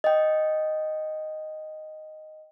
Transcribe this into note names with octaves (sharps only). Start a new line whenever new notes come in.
D#5 G5